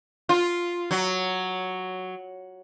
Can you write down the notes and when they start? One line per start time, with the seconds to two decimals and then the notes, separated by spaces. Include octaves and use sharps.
0.29 F4
0.91 F#3